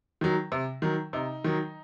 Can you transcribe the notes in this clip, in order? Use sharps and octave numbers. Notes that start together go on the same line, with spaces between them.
D#3 F#3
C3
D#3 F#3
C3 D#4
D#3 F#3